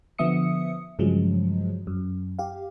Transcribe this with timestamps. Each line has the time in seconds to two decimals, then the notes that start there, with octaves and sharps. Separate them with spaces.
0.18 D3 F3 B3 E5 D#6 C#7
0.99 G2 C#3 F3 F#3 G#3
1.87 F#2
2.39 G4 F5